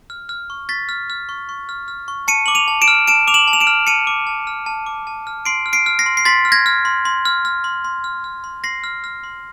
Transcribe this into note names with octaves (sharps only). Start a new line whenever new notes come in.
F6
F6
C#6
C#6 A6 B6
F6
F6
C#6
C#6
F6
F6
C#6
A5 C#7 D#7
D6 F#7
D#7 F7
A5
D7 E7
F6
A5 D7 E7
D6 F7
E7 F#7
A5
F7
D7 E7
F6
A5 C#7 D#7
D6
A5
F6
A5
D6
A5
F6
C6 C7 D7
F6
C7 D7
F6
A#6 C7
C6
C7
C6 A6 B6
F6
G#6 A#6
F6
C6
C6
F6
F6
C6
C6
F6
F6
C6
C6 A#6 C7
F6
F6
C6